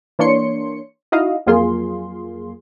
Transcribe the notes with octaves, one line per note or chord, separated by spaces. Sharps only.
E3 A#3 D4 C#5 C6 C#7
D#4 E4 F#4 D#5 F5
F2 F#3 A#3 F4 G#4 C6